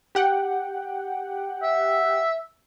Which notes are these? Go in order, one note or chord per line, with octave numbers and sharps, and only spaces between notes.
G4 F#5 G5
E5